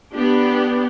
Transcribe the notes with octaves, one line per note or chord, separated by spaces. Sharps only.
B3 D4 G4